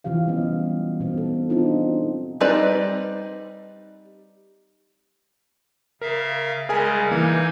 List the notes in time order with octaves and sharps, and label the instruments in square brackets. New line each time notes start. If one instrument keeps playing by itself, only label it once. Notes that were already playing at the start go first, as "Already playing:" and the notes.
[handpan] C3 E3 F3 G4 F5
F#3 G3 B3 C#4 D#5
E3 F3
B2 B3 C4 D#4 F#4
A4
B3 C4 D4 D#4 F4
[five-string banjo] G3 C4 D#4 B4 D5
[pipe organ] C#3 E5 F5 [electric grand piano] A#4
[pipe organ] C#3 G3 G#3 [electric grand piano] G#4 A#4 G#5
[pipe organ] C3 D#4 G#6 [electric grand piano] E3 A#3